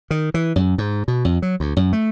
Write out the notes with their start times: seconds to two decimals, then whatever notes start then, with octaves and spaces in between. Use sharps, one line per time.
0.10 D#3
0.34 E3
0.56 F#2
0.78 G#2
1.08 B2
1.25 F2
1.42 F#3
1.60 D2
1.76 F#2
1.93 A3